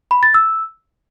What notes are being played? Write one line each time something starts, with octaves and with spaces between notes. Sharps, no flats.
B5
A6
E6